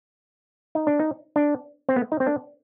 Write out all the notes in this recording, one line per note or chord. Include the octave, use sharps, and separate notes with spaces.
D#4
D4
D#4
D4
C4
B3
D#4
C4
D4